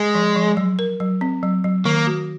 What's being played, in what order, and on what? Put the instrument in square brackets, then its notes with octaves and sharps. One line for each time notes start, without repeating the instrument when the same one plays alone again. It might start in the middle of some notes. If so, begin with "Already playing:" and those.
Already playing: [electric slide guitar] G#3
[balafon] F3
F3
F#3
A#4
F#3
C4
F#3
F#3
[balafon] D#3 [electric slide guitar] A#3
[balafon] F#4